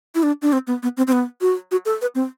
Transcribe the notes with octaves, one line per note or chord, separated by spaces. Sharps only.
E4
D4
D4
C4
B3
B3
C4
C4
B3
F#4
F#4
A4
B4
C4